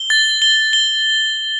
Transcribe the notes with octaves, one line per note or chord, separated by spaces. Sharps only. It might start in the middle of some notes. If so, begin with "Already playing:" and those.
Already playing: G7
A6
G7
G7